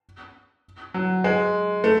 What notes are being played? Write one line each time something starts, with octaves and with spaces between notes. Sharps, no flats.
F#3
G#3
A3